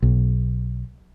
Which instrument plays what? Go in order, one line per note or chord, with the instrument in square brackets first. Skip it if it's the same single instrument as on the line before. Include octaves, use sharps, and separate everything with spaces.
[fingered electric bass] B1